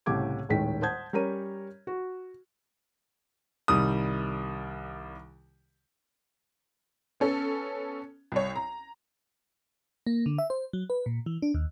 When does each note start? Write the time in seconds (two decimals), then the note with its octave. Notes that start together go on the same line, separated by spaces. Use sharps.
0.06 C2 A2 C#3 G4 D6 G#6
0.49 D#1 A2 D#3 G#3 G5 B6
0.82 C5 F#5 A5 D#6 G6 G#6
1.13 G3 C#4 A#4 C#5 A#5 D#7
1.87 F#4
3.68 C2 D#3 G3 D#6
7.20 B3 C#4 A4
8.32 C2 C#5
8.56 A#5
10.07 A#3
10.26 D3
10.38 E5
10.50 C5
10.73 F#3
10.90 B4
11.06 A#2
11.26 E3
11.42 D4
11.54 D#2